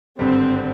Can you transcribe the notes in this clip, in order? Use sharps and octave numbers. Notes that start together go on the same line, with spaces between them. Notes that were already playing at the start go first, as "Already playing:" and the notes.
G#1 G2 D3 G3 C4